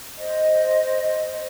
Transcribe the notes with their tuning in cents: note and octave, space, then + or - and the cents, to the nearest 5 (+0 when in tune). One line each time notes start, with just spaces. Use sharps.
C5 +0 D#5 +0